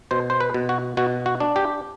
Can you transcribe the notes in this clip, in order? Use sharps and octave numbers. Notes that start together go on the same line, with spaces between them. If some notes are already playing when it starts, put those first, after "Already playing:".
B2 C5
C5
B4
B2
F#4
B2 F#4
F#4
D4
G4